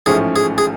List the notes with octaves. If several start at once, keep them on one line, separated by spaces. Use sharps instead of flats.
A1 G#2 F3 A3 C#4 G#4
G#4
G#4